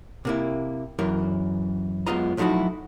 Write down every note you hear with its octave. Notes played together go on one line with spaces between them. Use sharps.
C3 A#3 E4
F#2 E3 A#4
F#2 G#3 B3 F4 D#5 A#5
F3 F#3 A3 D#4 E4 F#4